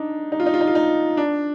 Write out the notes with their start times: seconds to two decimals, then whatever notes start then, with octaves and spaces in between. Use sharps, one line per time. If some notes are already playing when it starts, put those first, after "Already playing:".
Already playing: D4 D#4
0.32 D#4
0.40 F4
0.46 D#4
0.54 F4
0.61 D#4
0.68 F4
0.75 D#4
1.17 D4